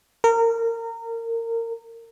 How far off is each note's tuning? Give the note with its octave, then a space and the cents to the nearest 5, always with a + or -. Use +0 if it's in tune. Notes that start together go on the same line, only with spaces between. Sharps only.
A#4 -25